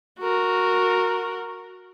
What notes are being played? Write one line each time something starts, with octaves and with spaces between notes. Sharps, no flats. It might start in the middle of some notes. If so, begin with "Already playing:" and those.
F#4 A#4